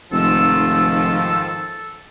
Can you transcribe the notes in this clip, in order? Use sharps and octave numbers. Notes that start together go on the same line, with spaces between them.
F1 G#2 D#3 F3 A4 E6